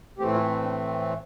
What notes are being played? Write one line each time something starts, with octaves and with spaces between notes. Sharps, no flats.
A2 E3 A3 C4 G4
F4
D4